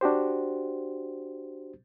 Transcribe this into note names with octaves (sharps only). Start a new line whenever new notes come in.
D4 F#4 G4 C5